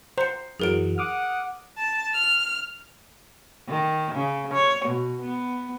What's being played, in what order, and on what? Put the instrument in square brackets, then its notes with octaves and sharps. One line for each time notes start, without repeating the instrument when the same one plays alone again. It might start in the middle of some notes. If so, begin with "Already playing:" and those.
[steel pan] C5 [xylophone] A#5 C#7
[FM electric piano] F#2 E3 F#3 [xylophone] G#4 A#4 D7
[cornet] F#5 [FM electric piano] D6 D#6 F6
[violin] A5
F6
[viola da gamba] D#3
C#3
C#5
B2
B3